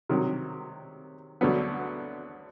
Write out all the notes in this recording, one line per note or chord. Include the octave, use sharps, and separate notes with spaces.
C3 D#3 F#3
D2 D3 F#3 B3